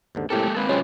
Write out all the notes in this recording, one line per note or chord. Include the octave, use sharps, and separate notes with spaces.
D#2 G#2 D3
A2 C3 G#3 A#3 G4 A4 A#4
G#3 A#3 C4 B4
C3 F#3 G#3 C#4 F4 C5 G5